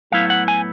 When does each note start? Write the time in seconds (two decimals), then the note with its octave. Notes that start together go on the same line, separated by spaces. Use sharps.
0.12 A2 F#3 B3 E4 F5
0.30 F#5
0.48 G#5